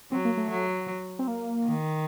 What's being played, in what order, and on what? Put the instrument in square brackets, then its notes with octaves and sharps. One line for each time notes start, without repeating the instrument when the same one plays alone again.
[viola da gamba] F#3 [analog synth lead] C4
[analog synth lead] A#3
A3
[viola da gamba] F#3
[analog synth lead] C4
A#3
[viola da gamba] D#3